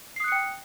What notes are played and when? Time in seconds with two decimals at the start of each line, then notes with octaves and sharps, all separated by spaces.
0.16 C7
0.20 D#6
0.24 F#6
0.28 C#7
0.32 G5